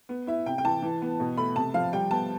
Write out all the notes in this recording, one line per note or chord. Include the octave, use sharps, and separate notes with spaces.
B3
E4 E5
C3 G5
G5
E3 A5
E3
B3
B2
A3 B5
C3 A5
F3 F5
G3 G5
B3 A5